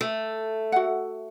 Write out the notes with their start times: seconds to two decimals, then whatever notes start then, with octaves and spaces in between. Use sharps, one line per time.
0.01 A3
0.72 F#4 F#5